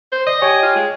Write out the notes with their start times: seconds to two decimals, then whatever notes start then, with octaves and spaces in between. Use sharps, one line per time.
0.12 C5
0.27 D5 D#5
0.42 G4 C#5 G5 G#5
0.63 F4
0.76 G#3